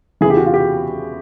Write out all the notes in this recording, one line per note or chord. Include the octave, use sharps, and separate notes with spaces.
E2 C#3 E3 G#4
G4
F#4
F4
G4